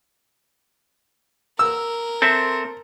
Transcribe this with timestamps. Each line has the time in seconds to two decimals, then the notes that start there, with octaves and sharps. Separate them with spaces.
1.59 A#4 E6
2.22 C4 A4 C5 E5